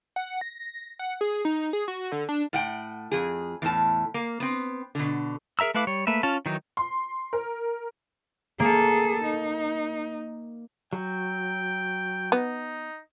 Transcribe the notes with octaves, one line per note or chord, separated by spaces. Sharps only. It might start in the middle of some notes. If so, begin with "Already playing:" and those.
F#5
A#6
F#5
G#4
D#4
G#4
F#4
D3
D4
A2 F#5 G5
F2 G#4
E2 A2 A5
A#3
B3 C4
B2 D3
G#4 A#4 E5 A#5 E6
A3 E4 B4 F5 D6
G3 C#5
A3 A#3 B4 E5
C#4 F4 A5
D#3 E3 F#3 D#4
C6
A#4
A#3 G#4 A4
D#4
F#3 G5
B3 D#4